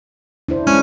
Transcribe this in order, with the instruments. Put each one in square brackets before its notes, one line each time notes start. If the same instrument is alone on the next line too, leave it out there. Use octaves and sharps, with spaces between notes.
[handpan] D4 E4 C5
[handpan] G#3 [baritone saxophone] C#4